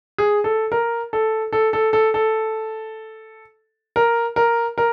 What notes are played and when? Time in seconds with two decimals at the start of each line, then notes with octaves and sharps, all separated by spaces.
0.18 G#4
0.44 A4
0.72 A#4
1.13 A4
1.53 A4
1.73 A4
1.93 A4
2.14 A4
3.96 A#4
4.36 A#4
4.78 A#4